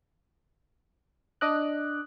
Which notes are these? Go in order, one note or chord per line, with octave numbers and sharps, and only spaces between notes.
D4 D#5 D6 F#6